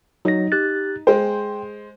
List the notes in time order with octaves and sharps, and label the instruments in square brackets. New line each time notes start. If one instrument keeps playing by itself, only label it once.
[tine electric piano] F#3 A#6 [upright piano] D#4
[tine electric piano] G4 F#6 A6
[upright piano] G#3 C5 [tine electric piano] G5